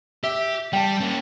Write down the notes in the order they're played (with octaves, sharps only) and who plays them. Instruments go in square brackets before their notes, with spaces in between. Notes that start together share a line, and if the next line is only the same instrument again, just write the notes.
[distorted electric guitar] G4 [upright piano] E5
[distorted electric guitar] G3 [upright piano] G5 A5
[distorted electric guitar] A#3 C#4